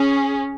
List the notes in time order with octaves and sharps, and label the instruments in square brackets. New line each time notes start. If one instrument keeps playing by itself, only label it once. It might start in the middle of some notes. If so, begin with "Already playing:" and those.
Already playing: [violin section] C#4 G#4